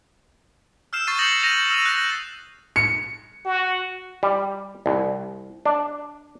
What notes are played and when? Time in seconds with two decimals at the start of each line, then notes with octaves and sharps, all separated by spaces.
0.93 E6 F6 G6 C7 E7
1.07 C#6 A6 C7 D#7
1.18 D#6 G6 A#6 C#7 F#7
1.43 A#6 D#7 F7
1.70 E6 F6 D#7
1.85 F#6 A#6
2.76 C#7
3.45 F#4
4.23 G3
4.86 C2
5.66 D4